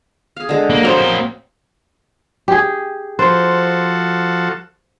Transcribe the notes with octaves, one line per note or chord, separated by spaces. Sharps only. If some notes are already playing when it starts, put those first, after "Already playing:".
G#4 F5
D3 G#3
A#3
F#3 A#3 C4 C5 D#5
G4 G#4
F3 F#4 A4 C5